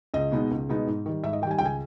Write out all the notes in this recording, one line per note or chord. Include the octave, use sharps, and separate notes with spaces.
C#2 D#5
B2 G#3 B3 D#4
C#2
B2 G#3 B3 D#4
G#2
D#3 G3
G#2 E5
D#5
D#3 G3 G5 G#5
C#2 G5
G#5